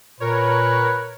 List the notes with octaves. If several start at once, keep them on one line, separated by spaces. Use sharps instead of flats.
A#2 A#4 B4 C#5